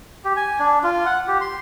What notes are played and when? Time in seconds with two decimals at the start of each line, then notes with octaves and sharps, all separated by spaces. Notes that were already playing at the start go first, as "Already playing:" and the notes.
0.25 G4
0.36 G#5
0.59 D4
0.83 F4
1.06 F#5
1.28 G4
1.41 C6